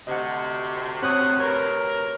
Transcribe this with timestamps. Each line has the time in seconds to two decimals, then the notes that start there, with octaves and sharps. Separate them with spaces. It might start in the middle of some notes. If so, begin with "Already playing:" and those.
0.07 D2 C3 D#5 F#5
1.02 C4 C#5 F#5 D#6
1.40 A#4 B4 C#5